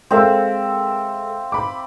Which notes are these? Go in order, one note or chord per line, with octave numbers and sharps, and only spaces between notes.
G#3 C4 A4 A#4 E5 F5
B5 D6